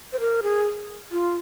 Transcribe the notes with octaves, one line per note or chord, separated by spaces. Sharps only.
C5
A#4
G#4
F4